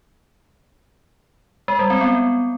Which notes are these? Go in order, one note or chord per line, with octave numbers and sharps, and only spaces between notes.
G#3
G3
C4
B3